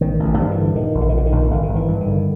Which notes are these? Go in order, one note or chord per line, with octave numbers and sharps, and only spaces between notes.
A1 D#3
A1
D#3
G2 F3
E3
D3
A#2 D#3
A#1
D3
D#3
A#2 D3
D#3
A#1
G#1 D3
D#3
G#1
E3
G2
D#3
D3